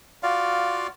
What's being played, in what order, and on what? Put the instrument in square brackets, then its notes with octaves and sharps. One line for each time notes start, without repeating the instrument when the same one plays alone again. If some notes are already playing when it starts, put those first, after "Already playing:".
[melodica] F4 F#4 D5 F5